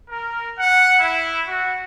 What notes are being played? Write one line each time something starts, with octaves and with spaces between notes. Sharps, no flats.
A#4
F#5
E4
F#4